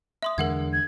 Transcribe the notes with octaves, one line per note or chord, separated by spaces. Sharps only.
E5 C6 D#6
E2 D3 G#3 A#4 F#5 G#6
G#6